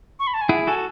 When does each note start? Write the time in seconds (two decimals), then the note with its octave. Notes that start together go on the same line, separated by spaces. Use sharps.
0.20 C#6
0.27 B5
0.34 A5
0.41 G#5
0.49 E4 G#4 F#5
0.67 F#4 A4 G#5